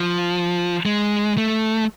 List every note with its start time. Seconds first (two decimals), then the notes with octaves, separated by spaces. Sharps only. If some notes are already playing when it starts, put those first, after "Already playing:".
Already playing: F3
0.86 G#3
1.38 A3